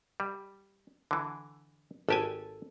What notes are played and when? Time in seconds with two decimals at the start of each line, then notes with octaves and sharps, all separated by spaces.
0.20 G3
1.11 D3 E3
2.09 G#1 G4 A4 G#5 A5